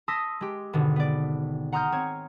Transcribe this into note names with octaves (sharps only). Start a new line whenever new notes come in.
A5 C6 D#6 E6 A#6 B6
G#3 G4
G#1 B2 D3
B3 D5
F#5 A#5 C6 D#6 F6 G6
C4 C#5 G#6